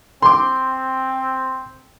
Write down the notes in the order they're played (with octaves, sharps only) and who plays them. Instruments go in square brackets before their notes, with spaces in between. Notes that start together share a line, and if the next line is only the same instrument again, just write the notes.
[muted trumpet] C4 [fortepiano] C6 D6